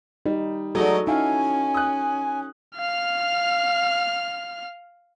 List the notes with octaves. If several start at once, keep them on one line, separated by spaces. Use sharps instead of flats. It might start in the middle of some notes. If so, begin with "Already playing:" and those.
G3 D#4
F#3 G#3 A3 D#4 F#4 A4 D5 D#5
C#4 D#4 E4 F5 G#5
D#6 F#6
F5 F6